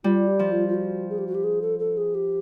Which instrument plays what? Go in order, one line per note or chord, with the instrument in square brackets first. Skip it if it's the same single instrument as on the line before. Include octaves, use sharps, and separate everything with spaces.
[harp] G3 [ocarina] F4
[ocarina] G4
[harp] F3
[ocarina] F4
F4
F#4
G#4
G4
F#4
G4
G#4
A4
A4
G#4
G4